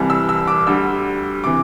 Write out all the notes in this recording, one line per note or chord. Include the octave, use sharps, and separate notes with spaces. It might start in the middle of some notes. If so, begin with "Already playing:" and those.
Already playing: C2 C3 E3 G3
E6
E6
D6
D2 D3 G3 E6
C3 E3 D6